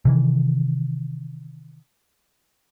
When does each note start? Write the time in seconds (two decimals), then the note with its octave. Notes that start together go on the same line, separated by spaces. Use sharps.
0.05 C3 D#3 E3